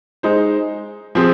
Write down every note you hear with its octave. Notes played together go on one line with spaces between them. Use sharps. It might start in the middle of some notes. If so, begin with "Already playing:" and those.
G#3 D#4 C5
F3 C4 G#4 C5